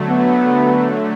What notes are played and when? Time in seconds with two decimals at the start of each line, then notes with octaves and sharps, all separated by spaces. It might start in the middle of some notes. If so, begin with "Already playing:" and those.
Already playing: D3 F#3 A3
0.08 B3